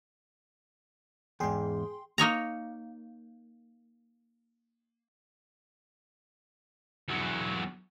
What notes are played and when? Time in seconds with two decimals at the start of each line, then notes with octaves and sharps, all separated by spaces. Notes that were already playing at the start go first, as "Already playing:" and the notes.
1.40 E2 G#2 G#4 G5 C6
2.18 A#3 D#4 C#5 A#5
7.08 E2 F#3